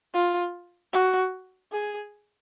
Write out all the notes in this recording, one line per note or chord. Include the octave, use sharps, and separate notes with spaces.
F4
F#4
G#4